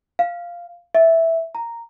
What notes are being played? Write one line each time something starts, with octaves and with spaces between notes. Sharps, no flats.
F5
E5
A#5